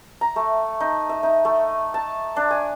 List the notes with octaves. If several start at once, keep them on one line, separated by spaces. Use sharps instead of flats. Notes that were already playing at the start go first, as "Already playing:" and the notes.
A#5
A3
D#4
E5
D#4
A3
A5
D4
G#5